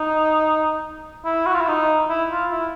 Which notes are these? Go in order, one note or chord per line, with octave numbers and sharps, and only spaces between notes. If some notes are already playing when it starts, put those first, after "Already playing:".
Already playing: D#4
E4
F#4
F4
E4
D#4
E4
F4
E4